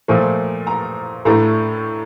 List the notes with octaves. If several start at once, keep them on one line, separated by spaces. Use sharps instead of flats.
A#2 F3 A3
A#5
A2 A3 D4 A#5